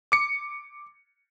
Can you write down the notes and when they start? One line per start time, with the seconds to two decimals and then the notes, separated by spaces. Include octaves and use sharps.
0.12 D6 C#7